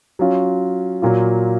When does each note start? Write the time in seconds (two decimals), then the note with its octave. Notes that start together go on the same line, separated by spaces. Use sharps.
0.19 F#3 C#4 F4
1.02 A#2 F#3 A#3 F4